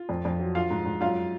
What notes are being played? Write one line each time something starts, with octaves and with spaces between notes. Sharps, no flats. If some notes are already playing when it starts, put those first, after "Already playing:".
Already playing: F4
F2
F2
F#3
F3 F4 F5
G#2
G#2
F#2 F4 F5